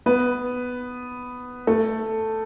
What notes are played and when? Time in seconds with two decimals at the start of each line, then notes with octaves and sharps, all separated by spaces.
0.06 B3 B4
1.67 A3 A4